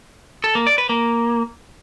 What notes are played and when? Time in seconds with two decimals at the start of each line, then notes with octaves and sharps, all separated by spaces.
0.44 A4
0.55 A#3
0.67 D5
0.78 B4
0.89 A#3